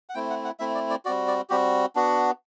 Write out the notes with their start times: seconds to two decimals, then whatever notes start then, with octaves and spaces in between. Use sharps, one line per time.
0.10 F#5
0.14 A3 C4 E4 G5
0.30 F#5
0.45 F#5
0.60 A3 C4 E4 E5
0.75 D5
0.90 D5
1.05 G3 C4 F#4 D5
1.28 D5
1.50 G3 C4 F#4 G4
1.96 B3 D4 F#4